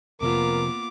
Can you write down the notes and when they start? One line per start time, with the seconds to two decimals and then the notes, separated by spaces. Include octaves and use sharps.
0.21 F2 C3 F3 A#3 B3 F4 A#4 D6